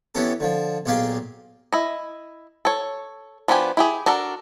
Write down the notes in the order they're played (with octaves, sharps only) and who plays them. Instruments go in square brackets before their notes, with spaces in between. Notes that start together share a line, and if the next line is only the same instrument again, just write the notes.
[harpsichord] E3 B3 C#4 G4 A4
D3 F3
B1 A#2 G4 G#4 F5 G5
[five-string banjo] E4 D#5
A4 C#5
F3 B3 D4 G4 G#5
E4 G4 G#4
D4 F#4 A4 A#4